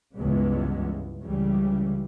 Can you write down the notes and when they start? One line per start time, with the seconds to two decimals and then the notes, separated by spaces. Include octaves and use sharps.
0.16 C#2 G2 C#3 E3 G#3 B3
1.22 C#2 C#3 E3 G3